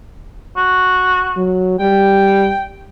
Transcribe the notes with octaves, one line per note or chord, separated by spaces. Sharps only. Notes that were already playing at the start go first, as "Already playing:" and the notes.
F#4
F#3
G3 G5